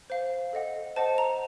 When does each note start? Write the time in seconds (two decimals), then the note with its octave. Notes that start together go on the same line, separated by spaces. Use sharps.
0.10 C5 F5
0.53 A4 D#5 F#5
0.96 C5 D#5 F#5 A5
1.18 A#5